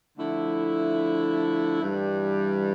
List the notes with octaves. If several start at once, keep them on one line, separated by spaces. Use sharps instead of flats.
D3 F3 A3 E4
G2 E3 G3